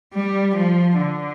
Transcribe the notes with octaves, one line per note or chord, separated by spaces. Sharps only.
G3
F3
D3